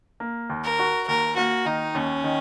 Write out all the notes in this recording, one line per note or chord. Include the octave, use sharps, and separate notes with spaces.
A#3
D#2
A#4
F#4
D#2 A#4
A#3 F#4
D#3 D#4
D#2 C#4
D#3